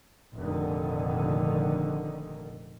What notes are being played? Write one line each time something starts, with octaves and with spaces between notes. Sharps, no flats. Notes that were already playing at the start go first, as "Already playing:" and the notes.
F1 A#2 D3 D#3